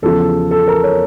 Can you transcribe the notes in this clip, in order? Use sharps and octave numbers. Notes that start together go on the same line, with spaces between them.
E2 C#3 F3 A4
A4
A#4
C#5